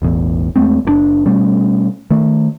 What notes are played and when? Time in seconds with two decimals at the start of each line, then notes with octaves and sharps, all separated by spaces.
0.02 E1 A1 E2
0.56 E2 G#3 A3 C4
0.85 F#1 C#3 D4
1.26 B2 G3 A3 C#4
2.11 D#3 A3